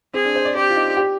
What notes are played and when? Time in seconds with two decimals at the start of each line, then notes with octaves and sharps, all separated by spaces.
0.14 C4 G#4
0.25 D4
0.36 C5
0.45 D5
0.56 G4 C5
0.70 F4
0.76 D#4
0.97 G4